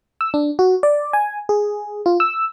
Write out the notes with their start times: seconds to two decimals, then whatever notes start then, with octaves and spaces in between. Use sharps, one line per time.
0.21 E6
0.34 D4
0.59 F#4
0.83 D5
1.13 G#5
1.49 G#4
2.06 F4
2.20 E6